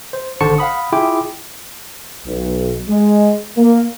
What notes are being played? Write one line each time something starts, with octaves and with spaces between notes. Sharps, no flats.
C5
G#1 D3 C5 A5 C#6 C#7
F5 F#5 B5 D#6
E4 F4 G#4 G5 D6
B1
G#3
A#3